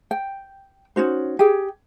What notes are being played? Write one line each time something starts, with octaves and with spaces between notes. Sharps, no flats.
G5
C#4 D#4 F#4 C5
G4 G#4 G5